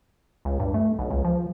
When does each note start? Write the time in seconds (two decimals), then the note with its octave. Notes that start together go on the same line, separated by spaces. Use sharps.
0.45 C#2
0.60 G2
0.74 A3
0.99 B1
1.11 C#2
1.25 F3